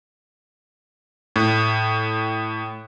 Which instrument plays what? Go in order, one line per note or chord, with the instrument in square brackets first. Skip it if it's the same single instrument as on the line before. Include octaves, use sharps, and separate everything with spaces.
[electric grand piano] A2